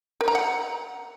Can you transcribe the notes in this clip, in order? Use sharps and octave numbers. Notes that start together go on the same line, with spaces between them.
A#4
A#5
F#5